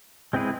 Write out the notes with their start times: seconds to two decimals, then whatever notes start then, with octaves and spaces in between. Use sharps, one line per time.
0.33 G#3 C4 E4 G#4 B4